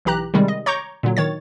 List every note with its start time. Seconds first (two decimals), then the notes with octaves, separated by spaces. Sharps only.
0.05 B1 E3 G4 A#5 F#6
0.34 C3 D#3 G3 G#3
0.48 D#5
0.66 C#5 A#5 C#6 D6 G6
1.03 A#2 D3 F#3
1.17 D#3 C#5 A6